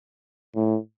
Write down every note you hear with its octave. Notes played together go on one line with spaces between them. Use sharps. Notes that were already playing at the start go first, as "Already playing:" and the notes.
A2